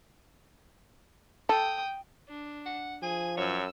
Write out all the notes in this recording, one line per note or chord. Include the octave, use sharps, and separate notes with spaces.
A4 G5 D#6
D4
F#5
F3 G#4 G#5
F#2 C#4 C#5 E6